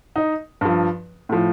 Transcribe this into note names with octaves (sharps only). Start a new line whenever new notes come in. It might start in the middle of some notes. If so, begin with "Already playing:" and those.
D#4
G2 F3
A2 F3